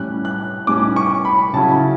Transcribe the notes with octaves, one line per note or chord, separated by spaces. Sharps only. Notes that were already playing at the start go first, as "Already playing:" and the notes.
Already playing: A2 G3 C#4 F#6
F#6
A2 G3 C#4 D6
C#6
B5
C#3 F#3 C#4 E4 A5